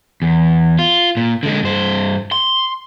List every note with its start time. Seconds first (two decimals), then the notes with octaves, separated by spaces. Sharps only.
0.22 E2
0.79 F4
1.17 A#2
1.43 D3 G#3
1.63 G2 C5
2.32 C6